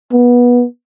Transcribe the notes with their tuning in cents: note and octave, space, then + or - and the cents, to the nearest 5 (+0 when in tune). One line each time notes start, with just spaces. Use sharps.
B3 -20